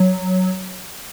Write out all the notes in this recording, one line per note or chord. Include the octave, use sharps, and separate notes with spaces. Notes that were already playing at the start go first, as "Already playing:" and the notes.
Already playing: F#3